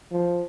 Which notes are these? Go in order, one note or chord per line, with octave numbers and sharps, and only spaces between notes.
F3